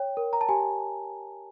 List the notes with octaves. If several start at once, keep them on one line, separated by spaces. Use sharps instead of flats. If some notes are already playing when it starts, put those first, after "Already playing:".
Already playing: C#5 G5
A#4
A#5
A5
G4 G#5